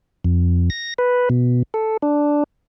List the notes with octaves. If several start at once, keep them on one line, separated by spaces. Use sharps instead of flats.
F2
A#6
B4
B2
A4
D4